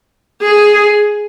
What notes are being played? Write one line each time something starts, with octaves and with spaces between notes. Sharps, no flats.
G#4